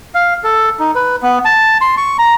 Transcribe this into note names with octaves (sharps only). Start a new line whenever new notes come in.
F5
A4
D#4
B4
B3
A5
C6
C#6
A#5